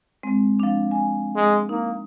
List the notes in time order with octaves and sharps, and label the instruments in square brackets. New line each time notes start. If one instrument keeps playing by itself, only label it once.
[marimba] G#3 C4
F3 D4
G#5
[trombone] G#3
[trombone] A#3 [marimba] D#4